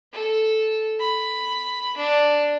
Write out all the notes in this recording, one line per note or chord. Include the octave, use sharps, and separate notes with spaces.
A4
B5
D4